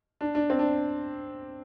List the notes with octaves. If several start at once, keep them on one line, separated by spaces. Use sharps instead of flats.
D4
D4
C4
D4